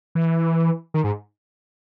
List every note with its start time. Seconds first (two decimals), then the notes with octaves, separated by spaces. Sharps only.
0.15 E3
0.94 D#3
1.04 G#2